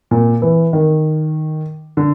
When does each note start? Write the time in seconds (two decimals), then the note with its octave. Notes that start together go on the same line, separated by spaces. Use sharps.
0.11 A#2
0.42 E3
0.73 D#3
1.97 D3